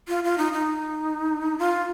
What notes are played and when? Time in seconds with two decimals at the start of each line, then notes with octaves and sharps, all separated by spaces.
0.08 F4
0.24 F4
0.38 D#4
0.53 D#4
1.59 F4